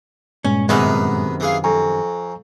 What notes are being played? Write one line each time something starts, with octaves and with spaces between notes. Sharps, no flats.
G2 A#2 G#3 C#4
F#2 C3 D#3 B3 G#4 B4
E3 G#4 F5
F2 G#5 A#5 C#6